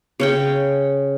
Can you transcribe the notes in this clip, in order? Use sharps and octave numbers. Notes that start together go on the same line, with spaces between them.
C#3 C#4 G5